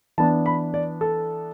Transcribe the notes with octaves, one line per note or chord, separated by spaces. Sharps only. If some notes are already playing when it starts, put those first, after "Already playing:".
E3 B3 D4 A5
B5
D5
A4